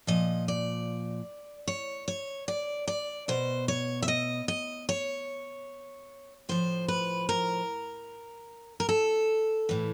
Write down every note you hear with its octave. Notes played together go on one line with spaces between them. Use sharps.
A#2 F3 D#5
D5
C#5
C#5
D5
D5
B2 C5
C#5
E5
D#5
D#5
C#5
A2 F3 C5
B4
A#4
A#4
A4
A2 E3